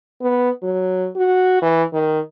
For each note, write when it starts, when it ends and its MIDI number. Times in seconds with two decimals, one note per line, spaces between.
0.21 0.50 59
0.63 1.08 54
1.16 1.58 66
1.62 1.83 52
1.93 2.19 51